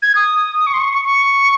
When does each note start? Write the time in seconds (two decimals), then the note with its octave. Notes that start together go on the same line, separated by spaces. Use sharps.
0.02 G#6
0.15 D#6
0.67 C#6
0.74 C6
0.80 C#6
0.93 C#6
1.05 C#6